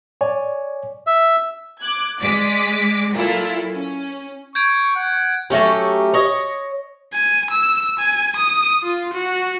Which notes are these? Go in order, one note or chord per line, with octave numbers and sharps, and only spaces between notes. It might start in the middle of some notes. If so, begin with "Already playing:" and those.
C#5 D5 G#5
E5
D6 F#6 G#6
G#3 D5 D6 B6
A#2 F#3 E4 F4 A4
C#4
C#6 G6 G#6 D7
F#5
F#3 A3 C#4 G4
C#5 D#5
G#5
E6
G#5
D#6
F4
F#4